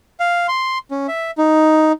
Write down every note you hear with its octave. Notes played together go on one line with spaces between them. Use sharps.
F5
C6
C#4
E5
D#4